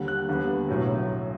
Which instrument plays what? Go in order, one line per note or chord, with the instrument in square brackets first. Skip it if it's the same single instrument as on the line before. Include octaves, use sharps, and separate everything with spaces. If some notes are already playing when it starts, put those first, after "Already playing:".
Already playing: [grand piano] D#2 D3 G3
F#6
D#2 D3 G3 B3
B1 A2 F#3